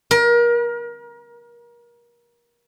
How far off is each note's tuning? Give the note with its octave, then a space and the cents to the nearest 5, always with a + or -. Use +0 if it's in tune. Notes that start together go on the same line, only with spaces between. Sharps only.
A#4 +30